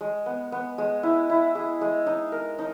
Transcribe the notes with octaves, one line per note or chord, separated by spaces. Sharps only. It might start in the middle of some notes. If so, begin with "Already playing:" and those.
G#3
B3
B3
G#3
E4
E4
G#4
G#3
D#4
A#4
D#4